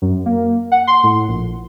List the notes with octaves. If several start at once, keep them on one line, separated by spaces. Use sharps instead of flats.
F#2
A#3
F#5
C6
A2
A#1